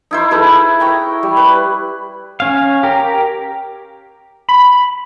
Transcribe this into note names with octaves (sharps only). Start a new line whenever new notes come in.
D#4 E4 C5
E4 G#4 A4 B4
G5 A#5 C#6
G3
B4
C#4 F5
G4 A#4
B5